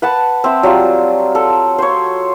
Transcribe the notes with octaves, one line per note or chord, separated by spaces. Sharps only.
B4 F#5 A5
C4 E5
F#3 G3 F4
A4
C5 C#5